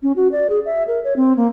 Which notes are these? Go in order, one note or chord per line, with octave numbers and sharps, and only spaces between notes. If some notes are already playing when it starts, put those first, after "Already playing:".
C#4
F#4
D5
G#4
E5
A#4
C#5
C4
A#3